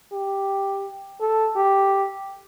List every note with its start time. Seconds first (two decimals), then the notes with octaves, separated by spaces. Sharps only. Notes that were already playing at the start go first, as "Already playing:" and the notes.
0.13 G4
1.20 A4
1.56 G4